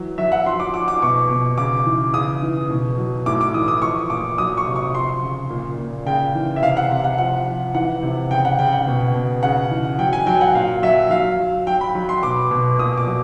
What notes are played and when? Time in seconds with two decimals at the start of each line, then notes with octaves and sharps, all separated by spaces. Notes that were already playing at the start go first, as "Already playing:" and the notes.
Already playing: E3 F#3
0.18 F#3 E5
0.32 F#5
0.46 F3 C6
0.60 D6
0.74 F3 D6
0.88 D6
1.02 B2 C#6
1.30 B2
1.58 C#3 D6
1.86 E3
2.14 C#3 D#6
2.42 E3
2.70 B2
2.98 F#3
3.26 A2 D6
3.41 D6
3.54 E3 D#6
3.68 D#6
3.82 F3 C#6
4.10 A#2 D6
4.38 F#3 D#6
4.57 C#6
4.66 C3
4.76 C#6
4.95 F3 C6
5.22 C#3
5.50 A#2
5.78 A#2
6.06 C#3 G5
6.35 E3
6.56 E5
6.62 C3 F5
6.77 F#5
6.90 C3
7.04 F#5
7.18 F3 F#5
7.46 F3
7.74 E3 F#5
8.02 C3
8.31 C#3 G5
8.45 F#5
8.59 C#3 G5
8.73 F#5
8.87 B2
9.15 B2
9.43 C#3 F#5
9.71 E3
9.99 F#3 G5
10.13 G#5
10.27 F#3 G5
10.41 F#5
10.55 A#2 F5
10.82 F#3 E5
11.10 F#3 F5
11.39 F#3
11.67 F#3 G5
11.81 B5
11.95 F#3
12.09 C6
12.23 B2 D6
12.51 B2
12.79 A#2 D#6
12.98 D6
13.07 F#3